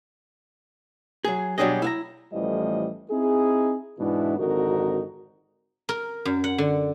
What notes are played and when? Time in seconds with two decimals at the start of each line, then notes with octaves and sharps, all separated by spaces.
1.24 F#3 G#4
1.58 B2 F#3 G3 D4 G#4 D#5
1.82 E4 F5 A#5
2.32 A1 A2 E3 F3 G3 D#5
3.11 C4 D#4 E4 G#4
4.00 G#2 B2 E3 B3 D4 E4
4.38 G#1 F2 D3 D#4 F#4 A#4
5.89 A#4
6.25 F#2
6.44 F#5
6.58 D3